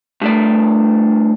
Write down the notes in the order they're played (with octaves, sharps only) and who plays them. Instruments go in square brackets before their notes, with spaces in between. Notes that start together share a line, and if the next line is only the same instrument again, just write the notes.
[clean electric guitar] G2 A3 D5